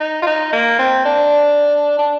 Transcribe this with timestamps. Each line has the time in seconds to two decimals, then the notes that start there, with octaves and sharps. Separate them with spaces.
0.01 D#4
0.22 F4
0.27 D#4
0.53 A#3
0.79 C4
1.05 D4
1.99 D4